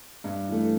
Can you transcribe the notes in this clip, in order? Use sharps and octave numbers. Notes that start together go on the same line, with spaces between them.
G2
E3 A3